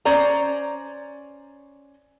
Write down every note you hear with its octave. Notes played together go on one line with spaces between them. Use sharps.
C#4 C5 D5 A#5